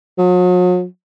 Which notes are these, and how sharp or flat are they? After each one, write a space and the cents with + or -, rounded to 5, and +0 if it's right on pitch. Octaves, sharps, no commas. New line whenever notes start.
F#3 -45